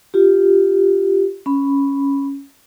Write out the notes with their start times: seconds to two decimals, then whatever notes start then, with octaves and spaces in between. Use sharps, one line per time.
0.14 F4 G4
1.46 C#4 B5